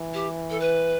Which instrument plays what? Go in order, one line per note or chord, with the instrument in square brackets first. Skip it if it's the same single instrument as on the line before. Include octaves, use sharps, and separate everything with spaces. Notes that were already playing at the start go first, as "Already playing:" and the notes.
Already playing: [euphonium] E3
[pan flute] G4
A4
B4